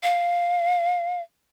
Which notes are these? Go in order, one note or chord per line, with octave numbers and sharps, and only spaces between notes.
F5